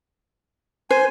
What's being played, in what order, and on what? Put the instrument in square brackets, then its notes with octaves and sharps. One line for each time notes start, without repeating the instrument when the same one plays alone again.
[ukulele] C5 [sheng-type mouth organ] G#5